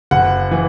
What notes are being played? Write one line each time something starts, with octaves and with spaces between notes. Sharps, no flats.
F#1 F#5
E3